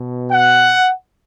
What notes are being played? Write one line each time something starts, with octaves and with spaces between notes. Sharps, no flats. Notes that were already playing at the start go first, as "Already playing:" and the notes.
Already playing: B2
F#5